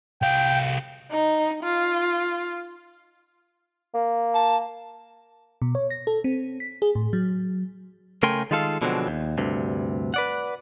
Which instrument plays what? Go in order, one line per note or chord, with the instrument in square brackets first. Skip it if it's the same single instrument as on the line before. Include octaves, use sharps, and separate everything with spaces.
[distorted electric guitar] C2 F5 [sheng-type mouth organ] G5
[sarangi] D#4
F4
[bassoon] A#3
[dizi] A5
[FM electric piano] B2
C#5
A#6
A4
C4
B6
G#4
A2
F#3
[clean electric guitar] C#3 A3 A#4 G5 G#5 C6
D#3 G#3 F4 A4 F5
B2 D3 F3 F#3 G#3 C4
D#2
D2 G2 C3
B4 D5 F#5